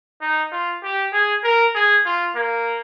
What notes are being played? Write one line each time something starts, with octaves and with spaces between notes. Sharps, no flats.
D#4
F4
G4
G#4
A#4
G#4
F4
A#3